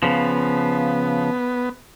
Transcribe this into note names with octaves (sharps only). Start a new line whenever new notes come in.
C#3 F3 B3